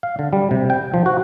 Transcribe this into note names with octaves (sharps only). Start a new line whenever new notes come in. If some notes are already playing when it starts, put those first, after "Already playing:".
F5
D3
G3
C3
G5
F3
F#4